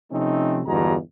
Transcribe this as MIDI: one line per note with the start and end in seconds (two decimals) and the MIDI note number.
0.12 0.62 48
0.12 0.62 53
0.12 0.62 57
0.12 0.62 60
0.12 0.62 61
0.12 0.62 63
0.67 0.95 31
0.67 0.95 40
0.67 0.95 43
0.67 0.95 56
0.67 0.95 66
0.67 0.95 82